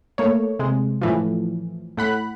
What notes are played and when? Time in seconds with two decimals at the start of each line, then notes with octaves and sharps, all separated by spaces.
0.18 A3 A#3 C#5
0.59 C3 G#3
1.01 A2 E3 F3
1.97 A2 F#5 B5 F#6